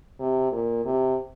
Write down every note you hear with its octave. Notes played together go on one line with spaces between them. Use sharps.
C3
A#2
C3